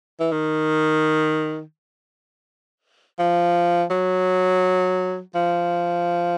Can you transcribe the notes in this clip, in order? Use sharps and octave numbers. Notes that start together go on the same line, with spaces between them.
E3
D#3
F3
F#3
F3